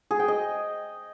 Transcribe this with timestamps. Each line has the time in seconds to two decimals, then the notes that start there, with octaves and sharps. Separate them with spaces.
0.11 G#4
0.19 G5
0.28 D#5